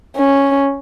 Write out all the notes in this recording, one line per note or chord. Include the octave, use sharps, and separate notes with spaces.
C#4